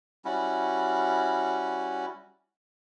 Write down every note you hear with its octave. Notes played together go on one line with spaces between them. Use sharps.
G3 C#4 E4 F#4